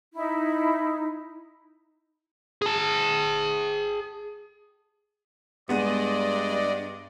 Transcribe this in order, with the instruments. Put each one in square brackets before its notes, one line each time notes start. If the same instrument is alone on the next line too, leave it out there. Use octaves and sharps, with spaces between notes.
[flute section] D#4 E4
[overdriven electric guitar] G#4 A5
[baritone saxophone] G2 [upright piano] G#3 D#7 [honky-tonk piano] B3 [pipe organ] D5 D#5